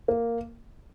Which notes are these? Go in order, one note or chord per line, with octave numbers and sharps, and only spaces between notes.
A#3